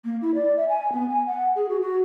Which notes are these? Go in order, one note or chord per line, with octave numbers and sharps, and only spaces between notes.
A#3
E4
D5
E5
G#5
B3
G#5
F#5
G#4
F#4
F#4